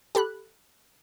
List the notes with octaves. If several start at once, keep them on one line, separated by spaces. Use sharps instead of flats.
G4 A4 B5 F#6